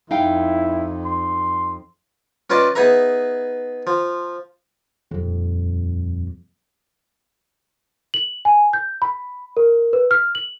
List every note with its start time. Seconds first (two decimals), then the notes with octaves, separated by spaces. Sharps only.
0.11 F2 D#4 E4 F5 G5
1.05 C6
2.50 C#4 F4 B4 D5 D#5 A5
2.75 B3 D#4 G#4 B4 E5 A#5
3.87 F3
5.11 D#1 F2
8.14 F#7
8.45 G#5
8.73 G6
9.02 B5
9.57 A#4
9.93 B4
10.11 F6
10.35 F#7